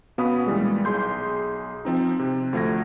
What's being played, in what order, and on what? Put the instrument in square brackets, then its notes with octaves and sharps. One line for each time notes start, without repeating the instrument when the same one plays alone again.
[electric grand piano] B2 B3 C#4 F5 B5 D#6
A#2 E3 G3 G#3
B1 G#4 C6 G6
F3 C4 D#4
C3
D2 F3 A3 G#6 A#6